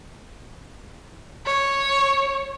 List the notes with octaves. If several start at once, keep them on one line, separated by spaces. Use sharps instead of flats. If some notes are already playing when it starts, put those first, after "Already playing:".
C#5